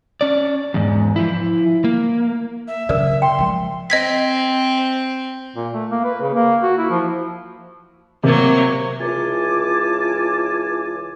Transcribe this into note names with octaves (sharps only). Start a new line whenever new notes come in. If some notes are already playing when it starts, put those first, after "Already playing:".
C#4 D5
E2 G#2
F3 E4
A#3
E5
C#3 F#3 A#4 D5
G5 C6
F3 G#3
C4 D#5 G#6 B6
A#2
A3
A#3
B4
C#3
A#3
F#4
E4
F3
C3 F#3 A#3
C#2 E3 F4 G#5 A5 D6